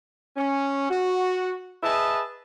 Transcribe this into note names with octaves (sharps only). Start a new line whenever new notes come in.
C#4
F#4
G#4 B4 D#5 E5 A5